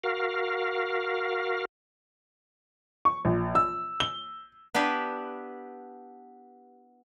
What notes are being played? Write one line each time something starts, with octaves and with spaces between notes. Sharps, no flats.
F#4 A#4 F5
C#6
A#1
E6
G7
B3 D4 E4 G4 B4